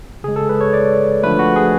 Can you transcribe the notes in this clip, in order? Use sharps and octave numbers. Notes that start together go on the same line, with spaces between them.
C#3 G#3 G#4
A4
B4
C#5
D5
D3 F3 A3 B4
F#4
G#4